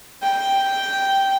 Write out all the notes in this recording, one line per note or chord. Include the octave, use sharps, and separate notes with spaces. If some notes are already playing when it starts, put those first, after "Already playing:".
G5